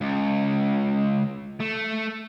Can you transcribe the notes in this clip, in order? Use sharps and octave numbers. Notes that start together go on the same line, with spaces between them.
C#2
A3